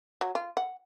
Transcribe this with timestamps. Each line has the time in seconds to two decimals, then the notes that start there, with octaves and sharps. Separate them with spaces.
0.21 F#3
0.35 F4
0.57 F#5